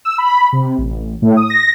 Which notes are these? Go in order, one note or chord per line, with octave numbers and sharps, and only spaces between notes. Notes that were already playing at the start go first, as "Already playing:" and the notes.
E6
B5
C3
A1
A2
D#6
A#6